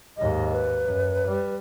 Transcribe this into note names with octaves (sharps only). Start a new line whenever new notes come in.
D#2 G#2 D#5
B4
F#2
G3